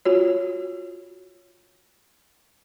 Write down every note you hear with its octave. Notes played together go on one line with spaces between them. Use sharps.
F4 F#4 C#5